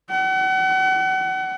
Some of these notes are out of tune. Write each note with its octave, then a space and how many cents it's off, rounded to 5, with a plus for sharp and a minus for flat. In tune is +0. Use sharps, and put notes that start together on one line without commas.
F#5 +35